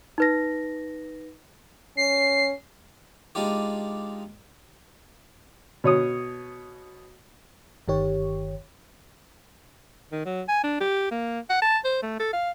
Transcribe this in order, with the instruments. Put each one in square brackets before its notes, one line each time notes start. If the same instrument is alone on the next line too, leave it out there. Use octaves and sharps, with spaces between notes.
[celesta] D#4 B4 A#6
[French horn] C#4 [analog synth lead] C7
[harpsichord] G#3 D4 D#4 F4 G4
[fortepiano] B2 C#5 D#6
[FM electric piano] G1 D#3 G4 C#5
[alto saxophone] D#3
F#3
G#5
D4
G4
A#3
F#5
A5
C5
A3
A4
F5